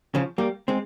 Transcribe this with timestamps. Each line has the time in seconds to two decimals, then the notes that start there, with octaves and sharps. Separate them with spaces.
0.15 C#3 F3
0.38 G3 A#3
0.68 G#3 C4